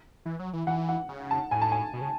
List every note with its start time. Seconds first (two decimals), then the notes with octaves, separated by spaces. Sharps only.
0.26 E3
0.39 F#3
0.53 E3
0.67 E3 F#5
0.89 F#5
1.09 C#3
1.31 A5
1.51 A2 G#5
1.61 A5
1.72 G#5
1.93 B2
2.01 C#3